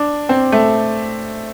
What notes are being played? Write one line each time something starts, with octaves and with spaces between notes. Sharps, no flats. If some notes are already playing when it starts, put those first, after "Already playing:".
Already playing: D4
C4
A3